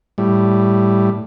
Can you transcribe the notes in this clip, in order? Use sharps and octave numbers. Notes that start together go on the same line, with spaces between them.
A2 G3